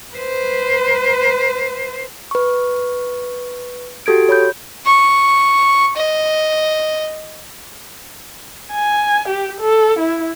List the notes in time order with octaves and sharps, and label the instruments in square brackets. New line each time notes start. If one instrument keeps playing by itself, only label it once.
[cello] B4 C5
[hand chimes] B4 C#6
F#4 G4 A4 G#6 D7
C#5 B5 G6
[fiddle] C#6
D#5
[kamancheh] G#5
G4
A4
E4